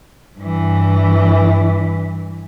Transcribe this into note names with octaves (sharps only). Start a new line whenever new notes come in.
G2 E3